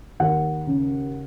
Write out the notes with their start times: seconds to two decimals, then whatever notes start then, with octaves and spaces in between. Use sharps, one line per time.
0.20 D#2 F#5
0.67 C#3